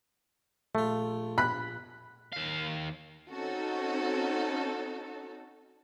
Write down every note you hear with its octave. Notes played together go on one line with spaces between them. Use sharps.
A#1 A3 F4
B5 F#6 B6
D#2 F5
C4 C#4 D#4 F#4 A4